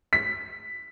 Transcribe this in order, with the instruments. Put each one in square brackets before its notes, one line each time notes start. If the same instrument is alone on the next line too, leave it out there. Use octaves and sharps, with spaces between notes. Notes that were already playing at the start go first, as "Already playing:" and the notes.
[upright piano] B6